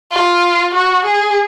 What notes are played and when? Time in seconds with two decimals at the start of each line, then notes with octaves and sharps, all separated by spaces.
0.11 F4
0.74 F#4
1.05 G#4